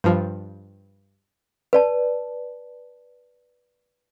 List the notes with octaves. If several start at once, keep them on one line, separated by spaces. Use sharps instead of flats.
G2 F3
B4 D5 A5